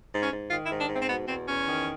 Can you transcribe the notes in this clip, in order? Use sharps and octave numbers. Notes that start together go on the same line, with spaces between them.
G#2
C#4
G#2
D#3 F4
E4
G#2
D4
G#2 C4
C4
B2 B3
E2 C4
E2 C#4
D#3